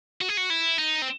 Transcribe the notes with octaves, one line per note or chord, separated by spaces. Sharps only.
F#4
G#4
F#4
E4
D#4
C4